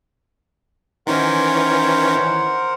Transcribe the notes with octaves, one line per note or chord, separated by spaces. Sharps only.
D#3 E3 C#4 A#4 C5 F#5